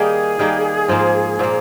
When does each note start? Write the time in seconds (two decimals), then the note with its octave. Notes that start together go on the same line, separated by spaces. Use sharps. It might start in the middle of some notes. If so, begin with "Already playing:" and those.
Already playing: D#3 G3 A#3 D#4 G#4
0.39 D#3 G3 A#3 D#4
0.88 G#2 F3 A#3 F4
1.39 A#2 F3 A#3